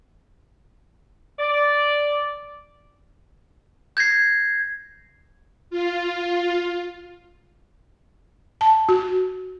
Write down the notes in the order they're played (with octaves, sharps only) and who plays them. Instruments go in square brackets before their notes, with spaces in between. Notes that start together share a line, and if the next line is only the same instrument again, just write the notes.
[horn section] D5
[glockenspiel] G6 G#6 A#6 C7
[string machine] F4
[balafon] A5
F#4